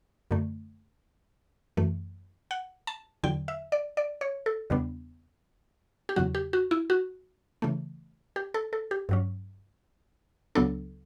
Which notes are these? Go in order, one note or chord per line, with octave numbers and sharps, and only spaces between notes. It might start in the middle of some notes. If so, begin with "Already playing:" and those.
F#2 D3 A3
F#2 E3 A3
F#5
A5
E2 D3 F#3 G5
E5
D5
D5
C#5
A4
E2 C#3 G3 B3 D4
G4
E2 C#3 F#3 F#4
G4
F#4
E4
F#4
C#3 E3 A3
G4
A4
A4
G4
G2 F#3 C#4
C#2 C#3 F#3 B3 D4 A4